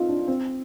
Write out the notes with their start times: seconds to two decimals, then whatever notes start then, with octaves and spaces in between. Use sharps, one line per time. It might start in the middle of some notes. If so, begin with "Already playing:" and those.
Already playing: C4 D#4 F4
0.09 D4
0.28 C4